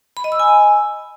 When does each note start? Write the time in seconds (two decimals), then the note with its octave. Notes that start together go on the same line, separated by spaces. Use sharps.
0.17 B5
0.24 D#5
0.32 E6
0.40 G#5